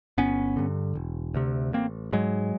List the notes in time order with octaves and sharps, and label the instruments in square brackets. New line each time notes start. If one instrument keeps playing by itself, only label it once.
[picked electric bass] G1 B3 C#4
G2 D3
E1
D2 C3
A1 A#3 C4
G#2 F#3 G#3